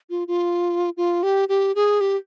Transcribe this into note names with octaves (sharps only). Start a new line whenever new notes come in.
F4
F4
F4
G4
G4
G#4
G4